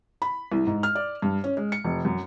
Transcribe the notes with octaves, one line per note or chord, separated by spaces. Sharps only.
B5
C2
G#2
F6
D5
G2
C#4
G#3
C#7
F1
F#2